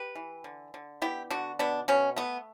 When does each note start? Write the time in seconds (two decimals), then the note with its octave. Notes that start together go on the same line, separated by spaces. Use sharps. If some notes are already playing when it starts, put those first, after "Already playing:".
Already playing: G4 B4
0.15 E3
0.44 D3
0.74 D3
1.02 B3 E4 G4
1.30 D3 D4 F#4
1.59 B2 B3 D4
1.88 B2 C#4
2.16 A3 B3